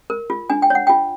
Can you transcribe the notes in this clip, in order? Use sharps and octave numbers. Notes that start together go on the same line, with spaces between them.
A#4
F4
D4 G#5
G5
C#5 F#5
F4 G5